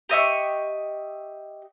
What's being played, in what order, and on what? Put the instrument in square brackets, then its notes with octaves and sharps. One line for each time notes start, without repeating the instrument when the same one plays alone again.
[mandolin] G4 D#5 E5 C#6